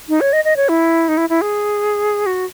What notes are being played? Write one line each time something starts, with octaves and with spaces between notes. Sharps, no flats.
D#4
C#5
D#5
D#5
C#5
E4
D#4
E4
E4
G#4
F#4